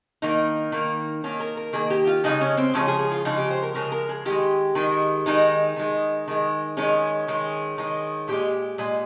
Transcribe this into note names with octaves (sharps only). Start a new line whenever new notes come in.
D#3 A#3 D#4
D#3 A#3
D#3 A#3 C#4
A#4
A#4
D#3 A#3 G#4
G4
F4
C#3 F3 G#3 D#4
C#4
C4
C#3 F3 G#3 C#4
G#4
G#4
F4
C#3 F3 G#3 D#4
G4
C5
A#4
C#3 F3 G#3 A#4
A#4
G#4
D#3 G#3 G4
D#3 G#3
D#3 G#3 D#4
D#3 G#3
D#3 G#3
D#3 G#3 C#4
D#3 G#3
D#3 G#3
A#2 G#3 G4
A#2 G#3